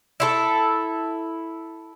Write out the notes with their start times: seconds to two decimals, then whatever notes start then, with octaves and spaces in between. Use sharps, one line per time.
0.20 E4 F4 A4